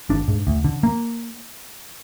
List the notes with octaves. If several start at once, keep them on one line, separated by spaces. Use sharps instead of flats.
G#1 D4
G#2
D2
D3
A#3